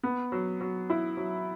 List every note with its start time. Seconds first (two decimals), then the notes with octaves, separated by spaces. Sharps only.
0.03 B3
0.32 F#3
0.61 F#3
0.90 E4
1.17 F#3